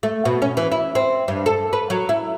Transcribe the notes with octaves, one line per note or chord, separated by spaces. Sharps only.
A3
B2
C#4
E3
E4
C4
G2
A4
B4
F#3
E4